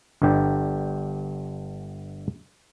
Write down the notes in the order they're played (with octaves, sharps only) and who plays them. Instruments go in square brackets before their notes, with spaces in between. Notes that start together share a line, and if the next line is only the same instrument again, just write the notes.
[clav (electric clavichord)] G1 G2 D3 G4